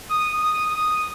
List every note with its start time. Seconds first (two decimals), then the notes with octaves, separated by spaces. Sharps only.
0.10 D#6
0.42 D#6
0.73 D#6